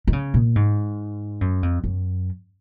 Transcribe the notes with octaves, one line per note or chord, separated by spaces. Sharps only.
D#3
C#3
A#2
G#2
F#2
F2
F#2